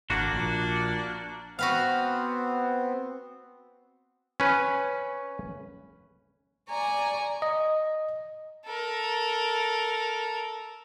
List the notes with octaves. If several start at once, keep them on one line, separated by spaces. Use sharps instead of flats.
G#1 A#3 D4 F#4
A#1 A#2
B3 C4 F#4 B4 F5
C#4 B4
D5 G#5 A#5 C#6
D#5
A4 A#4